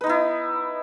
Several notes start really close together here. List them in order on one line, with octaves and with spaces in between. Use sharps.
B4 D#4 B3 E4